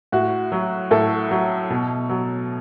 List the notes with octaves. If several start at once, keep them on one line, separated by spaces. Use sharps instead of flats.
A2 F#4
F#3
A2 A4
F#3
B2
F#3